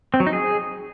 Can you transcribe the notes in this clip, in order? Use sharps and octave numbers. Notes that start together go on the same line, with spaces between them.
C4
F#3
D#4
G#4